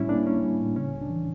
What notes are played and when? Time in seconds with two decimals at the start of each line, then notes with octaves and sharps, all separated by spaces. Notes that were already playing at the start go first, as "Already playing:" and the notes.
Already playing: A2 G3 C#4 E4
0.09 A#3 D4
0.27 C#4
0.43 G3
0.60 A2
0.76 C#3 C#4
0.93 C#2
1.02 D4
1.10 E3